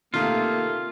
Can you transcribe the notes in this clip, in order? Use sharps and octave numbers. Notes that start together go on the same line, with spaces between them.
C3 D#3 A3 A#3 F4